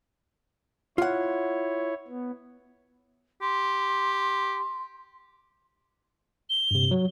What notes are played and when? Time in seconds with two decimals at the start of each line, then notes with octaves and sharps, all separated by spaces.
0.98 E4 F4 C#5 F#5
2.08 B3
3.41 G4 C6
6.50 G7
6.71 G2 C3
6.91 F#3